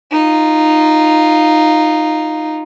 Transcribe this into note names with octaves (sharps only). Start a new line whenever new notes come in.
D#4 F4